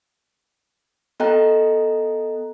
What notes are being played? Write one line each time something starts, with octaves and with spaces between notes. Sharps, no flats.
B3 A4 D#5 G5 A#5 F#6